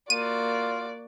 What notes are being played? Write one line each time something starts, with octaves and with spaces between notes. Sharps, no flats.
A#3 F4 F#4 D5 D#7